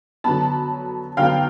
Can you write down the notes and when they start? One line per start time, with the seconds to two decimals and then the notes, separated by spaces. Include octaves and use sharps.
0.24 D3 F#3 B3 A5 B5
1.17 D3 F#3 B3 F5 G5